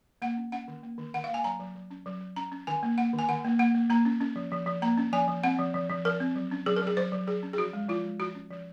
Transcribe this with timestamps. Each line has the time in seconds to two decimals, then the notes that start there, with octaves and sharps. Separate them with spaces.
0.22 A#3 F#5
0.37 C#4
0.52 C#4 F#5
0.68 D#3
0.83 A#3
0.98 D#3
1.14 D#3 F#5
1.24 F5
1.29 A#3
1.34 G#5
1.44 F#3 A#5
1.60 F#3
1.75 F#3
1.91 C#4
2.06 F#3
2.21 F#3
2.36 C#4 A#5
2.52 C#4
2.67 D#3 G#5
2.83 A#3
2.98 A#3 F#5
3.13 D#3
3.19 G#5
3.28 D#3 F#5
3.44 A#3
3.59 A#3 F#5
3.75 A#3
3.90 A#3 A#5
4.05 C#4
4.21 C#4
4.36 F3
4.52 F3
4.66 F3
4.82 A#3 A#5
4.98 C#4
5.13 F3 G#5
5.28 F3
5.43 C4 F#5
5.58 F3
5.74 F3
5.89 F3
6.05 F3 A#4
6.20 C4
6.36 F#3
6.51 C#4
6.66 F#3 G#4
6.76 A#4
6.82 F#3
6.87 G#4
6.97 F#3 C5
7.12 F#3
7.28 F#3 G#4
7.43 C#4
7.53 G#4
7.58 F3 F#4
7.73 G#3
7.89 F3 F4
8.04 G#3
8.20 F3 F#4
8.35 C#4
8.51 F3